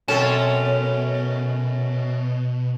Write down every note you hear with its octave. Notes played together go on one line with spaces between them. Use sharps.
F#2 B2 C4 C#4 A4 A5